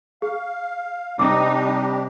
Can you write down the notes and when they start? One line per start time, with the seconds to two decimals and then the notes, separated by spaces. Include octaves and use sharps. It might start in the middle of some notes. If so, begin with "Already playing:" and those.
0.22 G#4 F5
1.19 C3 G3 D4 D#4 G4 D6